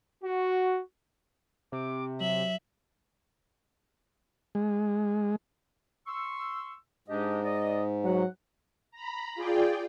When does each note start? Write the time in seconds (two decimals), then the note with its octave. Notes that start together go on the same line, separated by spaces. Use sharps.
0.24 F#4
1.72 C3 D6
2.21 F#3 E5 F#7
4.55 G#3
6.06 C6 C#6 E6
7.08 G#2 D4 G4 D#5
7.44 D5 D#5
8.04 F#3 F#4 F#5
8.91 A#5 B5
9.35 F4 G#4 D5 G5